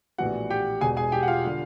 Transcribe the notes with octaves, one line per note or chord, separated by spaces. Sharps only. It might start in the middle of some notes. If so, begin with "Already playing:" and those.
A#1 A2 E3 G3 B3 F#4 F#5
G4 G5
E1 E2 B2 G#4 G#5
G#4 G#5
G4 G5
F#5
F4 F5
D3 G3